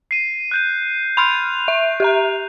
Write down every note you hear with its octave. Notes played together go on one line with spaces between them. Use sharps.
C7 D#7
F#6 G6 D#7
B5 C6 F6 F7
E5
G4 E5 A#5